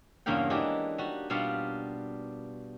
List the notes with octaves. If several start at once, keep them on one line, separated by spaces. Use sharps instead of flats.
E2 G2 C#3 A#3 F5 G5
E3 G#3 D4 D#4 G4
G3 F#4
B2 G3 D4 F4 F5 F#5